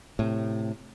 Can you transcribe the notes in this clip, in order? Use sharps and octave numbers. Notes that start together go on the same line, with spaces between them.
A2 C3